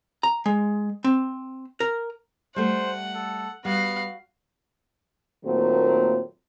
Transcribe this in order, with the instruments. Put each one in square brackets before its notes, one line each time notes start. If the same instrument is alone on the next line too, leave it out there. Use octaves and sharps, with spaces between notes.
[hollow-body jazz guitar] A#5
G#3
C4
A#4
[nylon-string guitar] G3 A3 [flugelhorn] C5 [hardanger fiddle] F#5
[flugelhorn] A4
[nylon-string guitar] G3 [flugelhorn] B3 [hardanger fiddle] F#4 F5
[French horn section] A#2 D#3 F#3 A3 A#3 C4